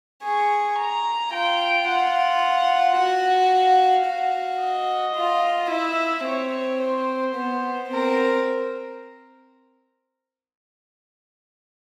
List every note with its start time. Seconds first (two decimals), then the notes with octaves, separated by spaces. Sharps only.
0.23 G#4 C#6
0.79 A#5
1.33 F4 G5
1.88 F4 F#5
2.97 F#4
3.52 F5
4.08 F#4
4.62 D#5
5.16 F4
5.71 E4 E5
6.26 C4 C#5
6.82 C5
7.36 B3
7.90 C4 A#4